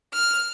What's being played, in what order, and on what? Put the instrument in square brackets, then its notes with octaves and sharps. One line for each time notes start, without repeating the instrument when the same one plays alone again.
[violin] F6